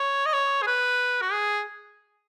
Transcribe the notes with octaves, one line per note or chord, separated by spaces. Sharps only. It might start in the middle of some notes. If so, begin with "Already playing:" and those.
Already playing: C#5
D#5
C#5
G#4
B4
F#4
G#4